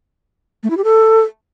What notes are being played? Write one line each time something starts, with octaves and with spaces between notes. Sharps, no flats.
A3
E4
G4
A4